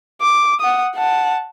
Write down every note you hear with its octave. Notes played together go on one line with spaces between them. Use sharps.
D6
F#5 D#6
F#5 A5